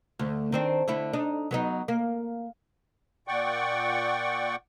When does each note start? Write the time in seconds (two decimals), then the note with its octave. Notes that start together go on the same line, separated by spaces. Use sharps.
0.19 D2
0.52 D#3 C4 D4
0.88 D3 A3 E4
1.13 D4 D#4
1.51 F#3 B3 D#4
1.88 A#3
3.28 A#2 D5 F#5 G5 C#6